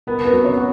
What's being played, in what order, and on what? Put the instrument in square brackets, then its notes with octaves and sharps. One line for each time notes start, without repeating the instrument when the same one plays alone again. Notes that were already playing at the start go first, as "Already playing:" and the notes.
[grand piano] B3 [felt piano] A#4
[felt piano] B4
[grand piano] F#3
[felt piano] C#5
[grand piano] F#4